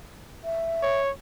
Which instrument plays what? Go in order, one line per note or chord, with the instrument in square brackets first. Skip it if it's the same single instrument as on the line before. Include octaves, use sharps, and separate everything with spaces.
[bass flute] E5
[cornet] C#5